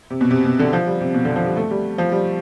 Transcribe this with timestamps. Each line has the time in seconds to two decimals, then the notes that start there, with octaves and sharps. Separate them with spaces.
0.10 C3
0.21 B2
0.31 C3
0.45 B2
0.59 D3
0.73 F3
0.87 G3
1.01 C3
1.14 B2
1.25 D3
1.36 F3
1.46 G3
1.56 A3
1.70 G3
1.98 F3
2.12 G3